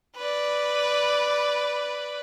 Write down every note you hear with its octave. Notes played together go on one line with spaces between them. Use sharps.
B4 D5